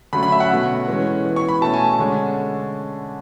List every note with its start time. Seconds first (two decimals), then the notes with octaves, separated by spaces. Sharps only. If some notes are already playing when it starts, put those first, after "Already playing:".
0.13 D3 F#3 A3 C#4 B5
0.23 B5
0.32 E5
0.40 F#5
0.50 B2 A3 C#4
0.88 E3 G#3 C#4
1.24 E3 B3
1.36 C#6
1.49 B5
1.61 B2 A3 C#4 A5
1.74 G#5
1.99 D3 G#3 C#4